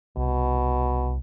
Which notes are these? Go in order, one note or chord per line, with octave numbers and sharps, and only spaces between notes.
C2 B2